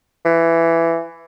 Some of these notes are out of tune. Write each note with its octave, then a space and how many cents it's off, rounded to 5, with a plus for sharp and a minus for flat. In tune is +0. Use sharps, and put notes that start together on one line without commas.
E3 +15